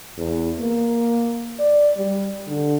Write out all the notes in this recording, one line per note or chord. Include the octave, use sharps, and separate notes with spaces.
E2
A#3
D5
G3
D3